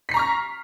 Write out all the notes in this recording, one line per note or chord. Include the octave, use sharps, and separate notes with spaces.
A#5 C#6 F6 B6 C7